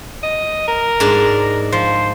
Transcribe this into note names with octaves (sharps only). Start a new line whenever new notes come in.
D#5
A#4
G#2 D4 G#5
F3 C5